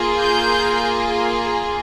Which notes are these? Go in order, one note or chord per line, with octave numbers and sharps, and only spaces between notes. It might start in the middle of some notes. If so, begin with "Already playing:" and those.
Already playing: A#3 F4 G#4
G6